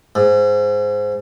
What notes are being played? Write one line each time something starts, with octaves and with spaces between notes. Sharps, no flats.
G#2